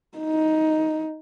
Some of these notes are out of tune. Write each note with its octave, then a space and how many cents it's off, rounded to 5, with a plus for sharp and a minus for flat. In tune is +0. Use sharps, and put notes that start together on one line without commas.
D#4 +10